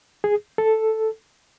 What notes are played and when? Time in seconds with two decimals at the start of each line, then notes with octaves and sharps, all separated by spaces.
0.24 G#4
0.58 A4